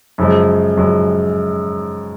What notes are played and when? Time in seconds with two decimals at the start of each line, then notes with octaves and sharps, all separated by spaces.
0.18 F#2 C#3 F3 G#3
0.77 F#2 C#3 F3 G#3